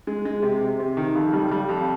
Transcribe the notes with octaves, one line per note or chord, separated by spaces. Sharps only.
G#3
G#3
C3
C3
C3
D#3
F2
G3
G3
F2